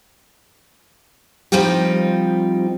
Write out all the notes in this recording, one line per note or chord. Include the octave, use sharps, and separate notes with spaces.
F3 G3 C4 D#4 F4 G4